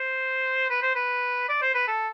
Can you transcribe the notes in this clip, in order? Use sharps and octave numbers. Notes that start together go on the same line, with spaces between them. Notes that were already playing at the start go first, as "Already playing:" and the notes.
Already playing: C5
B4
C5
B4
D5
C5
B4
A4